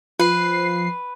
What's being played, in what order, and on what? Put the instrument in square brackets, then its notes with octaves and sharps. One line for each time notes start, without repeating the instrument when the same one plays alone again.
[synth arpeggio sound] F3 C7 [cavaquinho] B4